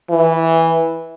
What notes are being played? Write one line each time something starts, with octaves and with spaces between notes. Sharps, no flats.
E3